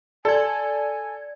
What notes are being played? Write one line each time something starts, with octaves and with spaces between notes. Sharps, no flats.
A4 D5 G#5 G#6